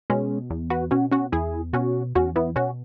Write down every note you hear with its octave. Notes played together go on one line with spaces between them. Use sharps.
B2 G#3 C#4
E2
F#4 B4
B2 C#4 F#4
C#4 F#4
E2 E4 G#4
B2 C#4 F#4
E2 C#4 F#4
B3 E4
B2 C#4 F#4